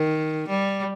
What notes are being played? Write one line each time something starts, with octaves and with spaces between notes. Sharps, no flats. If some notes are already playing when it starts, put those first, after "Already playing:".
Already playing: D#3
G3